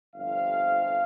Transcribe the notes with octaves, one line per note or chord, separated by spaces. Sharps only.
G1 F2 C3 F3 F5